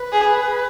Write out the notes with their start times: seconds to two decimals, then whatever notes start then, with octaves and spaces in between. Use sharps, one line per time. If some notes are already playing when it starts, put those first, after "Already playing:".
Already playing: B4
0.12 G#4